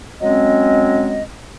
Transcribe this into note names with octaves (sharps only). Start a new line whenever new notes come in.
F#3 G#3 C4 C#4 D#5